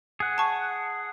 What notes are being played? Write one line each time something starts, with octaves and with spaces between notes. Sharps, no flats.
G#4 F#5
A5 C#6